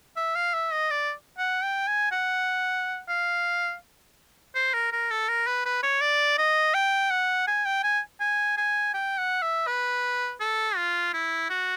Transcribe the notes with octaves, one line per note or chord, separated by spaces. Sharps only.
E5
F5
E5
D#5
D5
F#5
G5
G#5
F#5
F5
C5
A#4
A#4
A4
A#4
B4
B4
C#5
D5
D#5
G5
F#5
G#5
G5
G#5
G#5
G#5
G5
F#5
E5
B4
A4
F4
E4
F#4